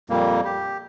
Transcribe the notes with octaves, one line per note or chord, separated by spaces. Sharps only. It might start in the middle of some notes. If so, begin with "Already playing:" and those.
F2 A#2 G3 A#3
G4